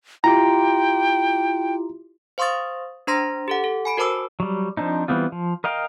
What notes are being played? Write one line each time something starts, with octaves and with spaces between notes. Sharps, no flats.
E4 F4 G4 G5 A#5
C5 F5 C6 C#6 D#6 A6
D4 C5 A#5 C6 A#6
G4 A4 F#5
A4
G#5 B5 D7
F#4 A#4 C5 A5 D6 E6
F#3 G3
F3 C4 D4 D#4
E3 G3 B3 C4 F4
F3
A#4 D#5 F5 G5